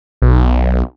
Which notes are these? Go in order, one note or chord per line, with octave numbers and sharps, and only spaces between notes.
B1